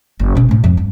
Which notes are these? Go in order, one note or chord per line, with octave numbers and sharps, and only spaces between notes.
F#1
B2 C#4
A2 A3
F2
G2